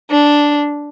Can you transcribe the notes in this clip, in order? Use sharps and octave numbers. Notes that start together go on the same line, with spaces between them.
D4